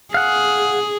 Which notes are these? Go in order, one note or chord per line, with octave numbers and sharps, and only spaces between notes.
G#4 F5 F#5